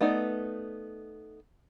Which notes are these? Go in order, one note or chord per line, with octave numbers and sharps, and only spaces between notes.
A3 B3 D#4 D5